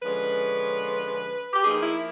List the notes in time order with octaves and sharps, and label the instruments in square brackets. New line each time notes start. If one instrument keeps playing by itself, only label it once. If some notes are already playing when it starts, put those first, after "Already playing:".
[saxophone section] D3 F3 G#3 C#4 B4
G4
F3 A#3 D#4 G#4
E4